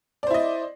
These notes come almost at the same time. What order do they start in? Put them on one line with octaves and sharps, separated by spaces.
D5 C5 E4 D#5